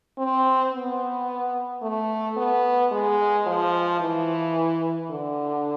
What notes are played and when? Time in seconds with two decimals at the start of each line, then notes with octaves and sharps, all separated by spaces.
0.18 C4
0.73 B3
1.82 A3
2.37 B3
2.92 G#3
3.47 F3
4.01 E3
5.10 D3